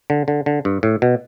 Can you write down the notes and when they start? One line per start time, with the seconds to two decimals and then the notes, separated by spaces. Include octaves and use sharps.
0.10 D3
0.28 D3
0.46 D3
0.65 G2
0.83 A2
1.02 B2